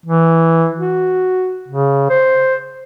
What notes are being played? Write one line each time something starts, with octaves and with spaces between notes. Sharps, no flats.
E3
F#4
C#3
C5